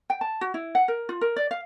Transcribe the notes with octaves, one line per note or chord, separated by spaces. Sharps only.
G5
A5
F#4
E4
F#5
A#4
F4
A#4
D5
F5